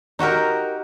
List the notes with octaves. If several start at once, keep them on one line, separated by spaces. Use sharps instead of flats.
D#4 F#4 G4 A#4